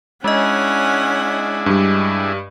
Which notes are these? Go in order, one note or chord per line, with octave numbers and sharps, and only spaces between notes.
G#3 C#4 D4 E4 G#4 D#5 F#5
G2 G3